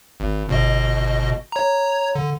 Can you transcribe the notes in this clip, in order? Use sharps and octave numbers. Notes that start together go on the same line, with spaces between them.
G#1
G1 B2 D#5
C#5 A#5
D3